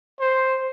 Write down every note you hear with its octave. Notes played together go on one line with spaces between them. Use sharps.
C5